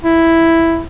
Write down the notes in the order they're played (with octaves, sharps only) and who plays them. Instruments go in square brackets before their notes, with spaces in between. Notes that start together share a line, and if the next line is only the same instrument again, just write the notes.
[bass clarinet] E4